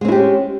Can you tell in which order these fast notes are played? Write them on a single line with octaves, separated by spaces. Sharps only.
G#3 C4 E4 G4 C#4